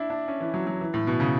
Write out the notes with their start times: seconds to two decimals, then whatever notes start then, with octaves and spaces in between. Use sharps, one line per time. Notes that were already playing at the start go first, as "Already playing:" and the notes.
Already playing: D4 E4
0.10 D4
0.28 C#4
0.40 E3
0.54 F#3
0.67 F#3
0.81 E3
0.94 A2
1.07 B2
1.20 C#3